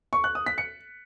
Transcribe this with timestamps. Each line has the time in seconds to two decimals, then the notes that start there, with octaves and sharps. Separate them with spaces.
0.13 C#6
0.24 F#6
0.35 D#6
0.46 B6
0.58 C#7